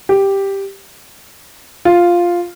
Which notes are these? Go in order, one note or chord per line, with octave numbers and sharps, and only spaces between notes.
G4
F4